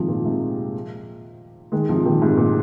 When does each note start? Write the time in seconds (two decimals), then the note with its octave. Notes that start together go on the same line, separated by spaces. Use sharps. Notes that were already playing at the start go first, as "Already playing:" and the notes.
Already playing: C3 D#3 F3 G#3
0.08 A#2
0.25 G#2 C3
1.72 D#3 G#3
1.89 C3 F3
2.05 A#2 D#3
2.21 G#2 C3
2.37 A#2